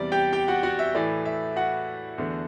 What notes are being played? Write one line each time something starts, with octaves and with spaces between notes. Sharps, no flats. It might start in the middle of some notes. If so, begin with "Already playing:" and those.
Already playing: E2 C3 G3 D5
G4 G5
G4 G5
F#4 F#5
F#4 F#5
E5
A2 E3 A3 D5
E5
F#4 F#5
E2 D3 A3